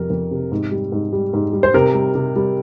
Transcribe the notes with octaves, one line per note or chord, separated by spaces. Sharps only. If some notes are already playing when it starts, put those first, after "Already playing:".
Already playing: F2 C3 G3 A#4
F2
C3
G#2
G3
G#2
G3
G#2
G3
C5
C3 A#4
G3
C3
G3